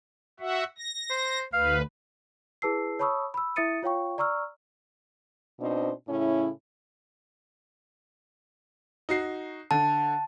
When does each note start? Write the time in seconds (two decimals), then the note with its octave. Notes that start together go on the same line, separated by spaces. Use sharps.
0.40 F#4 E5 F#5
0.78 A#6
1.10 C5
1.53 D2 B4 F5
2.62 E4 G#4 B4 A5 E6 C7
2.99 C#5 A5 B5 C#6 D#6 E6
3.34 B5 E6
3.56 E4 E5 D#6 A6 C#7 D#7
3.83 F4 C#5 F5 G5 C#6
4.18 D5 A#5 C#6 E6 F6
5.60 B2 C4 D4 D#4 C5 D#5
6.08 A2 C#3 C#4 E4
9.09 D#4 F#4 C7
9.71 D3 A5